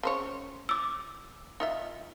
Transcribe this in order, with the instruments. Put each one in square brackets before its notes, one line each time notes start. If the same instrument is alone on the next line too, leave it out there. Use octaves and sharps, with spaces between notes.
[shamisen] C#3 C5 C#5
[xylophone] D6 E6
[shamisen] D#4 F4 E5